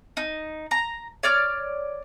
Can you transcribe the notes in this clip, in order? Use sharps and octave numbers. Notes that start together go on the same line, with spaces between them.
D#4
A#5
C#5 D5 F6